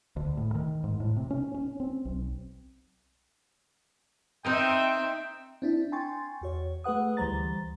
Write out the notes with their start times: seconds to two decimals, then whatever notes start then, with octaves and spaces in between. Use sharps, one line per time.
0.17 D2
0.37 A2
0.55 D#3
0.84 G#2
1.00 A2
1.17 C3
1.31 C#4
1.54 C#4
1.80 C4
2.05 B1
4.44 C4 D#4 A#4 D#5 E5 G5
5.62 C4 D4 E4
5.92 G5 G#5 C6 C#6 A6
6.41 E2 F#4 C#5
6.84 A3 G#4 B4 F#5 D#6
7.17 D2 E3 G3 C5 A#5 A6